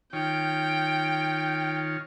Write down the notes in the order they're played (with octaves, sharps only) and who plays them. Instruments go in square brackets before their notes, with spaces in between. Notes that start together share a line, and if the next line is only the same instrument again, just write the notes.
[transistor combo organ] D#3 F4 C#5 [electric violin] G5